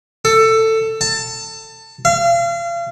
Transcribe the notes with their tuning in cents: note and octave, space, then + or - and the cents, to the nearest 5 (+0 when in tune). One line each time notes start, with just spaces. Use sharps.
A4 +15
A5 +20
F5 -35